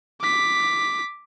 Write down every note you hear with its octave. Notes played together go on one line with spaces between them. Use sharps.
D6 B6